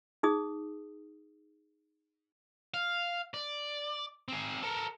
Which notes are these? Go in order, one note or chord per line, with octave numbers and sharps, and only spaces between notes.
D#4 G#4 D#6
F5
D5
C4 G#4
A4 A#4